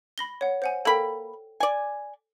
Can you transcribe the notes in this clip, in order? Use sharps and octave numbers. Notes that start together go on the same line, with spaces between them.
B5 A#6 G7
C#5 F#5
C5 F#5 G#5
A#3 A4 G5 B5
D5 G#5